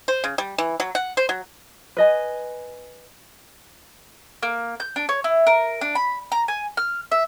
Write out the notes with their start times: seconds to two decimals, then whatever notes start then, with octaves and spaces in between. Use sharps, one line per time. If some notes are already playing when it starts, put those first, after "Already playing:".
0.08 C5
0.24 C#3
0.38 G3
0.58 E3
0.80 F#3
0.95 F#5
1.17 C5
1.29 F#3
1.97 B4 D#5 G#5
4.43 A#3
4.80 G6
4.96 D4
5.09 C#5
5.24 E4
5.47 A#4
5.81 D4
5.95 B5
6.32 A#5
6.48 G#5
6.77 F6
7.12 E5